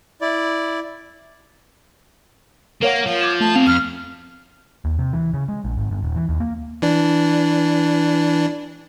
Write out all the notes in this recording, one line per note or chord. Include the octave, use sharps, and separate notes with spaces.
E4 D5
A#3 A#4 C#5 F5 F#5
F3 F5
D6 G#6 E7
A3 A5
B2 C4 F5
F2 F6
D#2
C3
E3
C#3
G#3
A#1
G#1
G1
D#1
E3
D#2
A#3
E3 D4